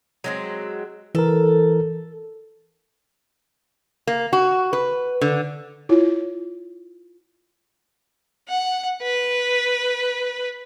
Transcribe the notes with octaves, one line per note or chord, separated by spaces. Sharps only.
F#3 G#3 C4
E3 A4 A#4
A#3
F#4
B4
D3
E4 F4 C#5
F#5
B4